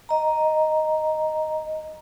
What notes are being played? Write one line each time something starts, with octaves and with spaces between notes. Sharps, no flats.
D#5 A#5